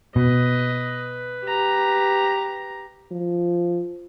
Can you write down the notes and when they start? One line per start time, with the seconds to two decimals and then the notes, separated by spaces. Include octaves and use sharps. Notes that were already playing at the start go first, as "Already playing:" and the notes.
0.16 B2 B4 D#5
1.45 G4 A#5
3.11 F3